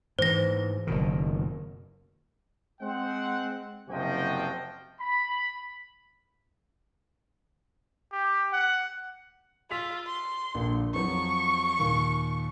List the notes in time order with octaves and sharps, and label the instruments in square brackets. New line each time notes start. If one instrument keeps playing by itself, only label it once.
[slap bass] G#2 E3 [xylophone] C5 A#6
[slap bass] F#1 B2 D#3
[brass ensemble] G#3 C4 F#5
F#1 C3 F3 F#4 D#5 G5
[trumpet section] B5
[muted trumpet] G4
F#5
[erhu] F4 [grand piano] E6 B6 F7
[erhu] C6
[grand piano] A#1 A#2 D3
[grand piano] F2 F3 F#3 [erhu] C#6
[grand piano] D#2 A#2